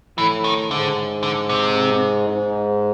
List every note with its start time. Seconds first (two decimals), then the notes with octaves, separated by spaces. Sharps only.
0.18 A2 E3
0.44 D#3
0.71 G#2 D3
1.23 D3
1.50 C3
2.28 G#2